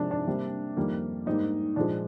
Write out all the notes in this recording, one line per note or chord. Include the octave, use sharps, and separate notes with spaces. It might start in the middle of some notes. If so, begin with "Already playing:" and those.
Already playing: C3 F3 G#3 D4
D4
C3 G3 A#3
F2 D#3 G3 A#3
G#2 G3 A#3 D#4
A#2 F3 G#3 D4